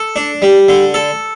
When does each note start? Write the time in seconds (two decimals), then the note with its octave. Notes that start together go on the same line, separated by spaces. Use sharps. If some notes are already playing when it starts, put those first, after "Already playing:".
Already playing: A4
0.16 D4
0.42 G3
0.69 D3
0.94 A4